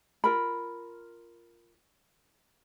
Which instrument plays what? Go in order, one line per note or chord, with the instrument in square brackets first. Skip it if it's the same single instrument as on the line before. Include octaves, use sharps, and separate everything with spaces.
[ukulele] F4 A#4 B5